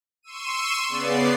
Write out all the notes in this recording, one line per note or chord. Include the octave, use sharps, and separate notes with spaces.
C6 C#6 E6 D#7
C#3 B3 D5 C7